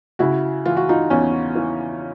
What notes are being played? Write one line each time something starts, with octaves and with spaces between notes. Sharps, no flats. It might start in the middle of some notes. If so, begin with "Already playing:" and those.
C#3 E4 F#4
E3 F4
F#4
D#4 F4
E2 C#4
E3